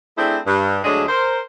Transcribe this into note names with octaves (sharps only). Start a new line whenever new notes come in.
A3 C4 D4 E4 G#4 C5
G2
D2 D3 F#3 G#3 D4 G#4
A#4 C5